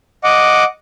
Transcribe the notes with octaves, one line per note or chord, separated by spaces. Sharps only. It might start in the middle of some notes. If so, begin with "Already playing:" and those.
D#5 F#5 D6